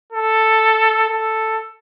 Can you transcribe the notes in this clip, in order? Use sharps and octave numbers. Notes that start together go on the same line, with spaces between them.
A4
A4